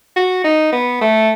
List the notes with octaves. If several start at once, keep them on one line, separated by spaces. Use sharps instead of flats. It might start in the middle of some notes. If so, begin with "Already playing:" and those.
F#4
D#4
B3
A3